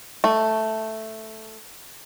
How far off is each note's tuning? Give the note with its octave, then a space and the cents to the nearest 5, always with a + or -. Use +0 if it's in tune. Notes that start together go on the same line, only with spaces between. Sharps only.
A3 +0